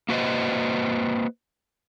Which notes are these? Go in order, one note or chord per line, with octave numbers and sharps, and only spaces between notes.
A#3 F#4 B4 C5 D#5